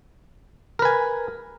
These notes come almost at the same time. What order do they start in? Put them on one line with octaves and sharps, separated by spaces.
A#4 B4 G#5